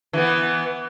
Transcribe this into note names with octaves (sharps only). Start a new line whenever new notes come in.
E3 B3